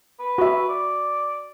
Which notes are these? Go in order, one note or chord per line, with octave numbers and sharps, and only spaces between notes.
B4
F#4 E5
D5